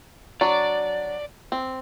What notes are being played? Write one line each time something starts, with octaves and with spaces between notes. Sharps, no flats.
F#3 D4 D5
C4